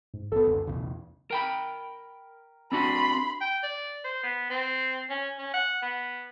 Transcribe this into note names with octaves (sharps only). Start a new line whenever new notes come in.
G#2
A#1 B3 A4
C#2 F#2 D3
B1 E2 C#3
A#4 G5 B5
C4 D4 F#4 B5 C6
G5
D5
C5
B3
C4
C#4
C#4
F#5
B3